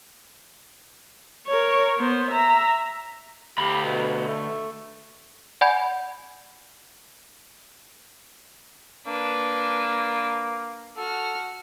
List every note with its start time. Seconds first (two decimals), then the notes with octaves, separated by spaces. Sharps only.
1.47 A#4 C#5
1.98 B3 C5
2.31 E5 A#5
3.58 D2 G4 B5
3.84 B2
4.27 A3
5.61 D5 F#5 G#5 B5 G6 G#6
9.07 A#3 D4 B4
10.97 F#4 A4 F6